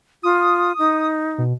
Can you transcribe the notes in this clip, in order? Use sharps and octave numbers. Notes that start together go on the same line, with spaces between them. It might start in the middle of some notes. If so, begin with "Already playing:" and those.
F4 D#6
D#4
B2